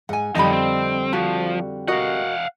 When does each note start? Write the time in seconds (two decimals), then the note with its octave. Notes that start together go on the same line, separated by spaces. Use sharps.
0.09 G#2 F#5 G#5
0.35 F2 D3 F3 G3 D#4 D#5 B5
0.53 C4
1.13 F3 F#4
1.88 F#4 A#4 D#5 F5 F#5